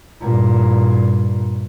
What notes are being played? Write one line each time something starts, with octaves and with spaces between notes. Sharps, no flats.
G2 A#2